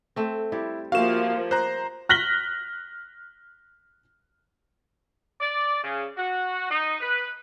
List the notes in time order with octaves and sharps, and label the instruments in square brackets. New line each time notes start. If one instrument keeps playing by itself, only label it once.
[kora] A3 C4
[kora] G3 [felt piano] E4
[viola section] F3 A#3 [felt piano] F#4 G4 E5 [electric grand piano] F5 E7
[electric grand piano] C5 A#5 [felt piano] F#6
[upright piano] F6 F#6 A#6 B6 F#7 G7
[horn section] D5
C#3
F#4
D#4
B4